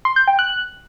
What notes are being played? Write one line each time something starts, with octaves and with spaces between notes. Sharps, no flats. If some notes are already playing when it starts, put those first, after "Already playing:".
C6
G6
G5
F#6